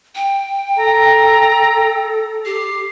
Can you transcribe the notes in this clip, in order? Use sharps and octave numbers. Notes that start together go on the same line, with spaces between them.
G5
A4 A#5
G4 C7